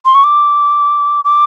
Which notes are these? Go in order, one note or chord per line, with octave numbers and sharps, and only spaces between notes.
C6
C#6
D6
D6